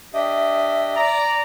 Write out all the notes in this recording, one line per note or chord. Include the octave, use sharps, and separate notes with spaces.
D4 G4 D#5 E5
D5 A#5